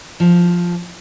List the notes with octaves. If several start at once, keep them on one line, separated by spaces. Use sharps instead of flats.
F3